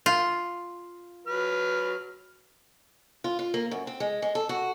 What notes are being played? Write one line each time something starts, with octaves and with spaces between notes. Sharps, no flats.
F4
F#3 B4 F6
F4
F4
A#3
F#2
C4
G#3
G#3
A4
F#4